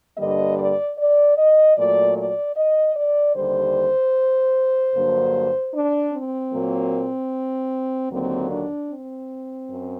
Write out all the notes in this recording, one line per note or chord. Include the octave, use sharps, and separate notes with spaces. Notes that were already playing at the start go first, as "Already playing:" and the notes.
G2 D3 G3 A#3 D#5
D5
D5
D#5
A#2 F#3 A3 D5
D5
D#5
D5
D#2 D3 G3 C5
G2 D3 F#3 A#3
D4
C4
A#2 F#3 A#3
D#2 D3 F#3 A#3 C4
D4
C4
F#2